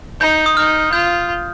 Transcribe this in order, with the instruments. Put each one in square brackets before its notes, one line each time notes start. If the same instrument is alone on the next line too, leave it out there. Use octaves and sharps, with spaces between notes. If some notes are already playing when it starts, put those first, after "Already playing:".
[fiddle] D#4 [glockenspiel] G6
[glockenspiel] D#6
[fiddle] D#4 [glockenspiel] F6
[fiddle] F4 [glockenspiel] G6